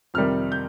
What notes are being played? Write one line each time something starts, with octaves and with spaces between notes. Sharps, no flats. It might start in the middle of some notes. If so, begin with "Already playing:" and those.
F2 C3 D#3 G3 F6
G6